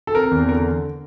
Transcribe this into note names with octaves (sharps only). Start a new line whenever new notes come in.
A4
C4 A#4
E2
D3 A#4